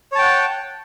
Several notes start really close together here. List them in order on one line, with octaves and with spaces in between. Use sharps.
C#5 A5 G5 F#5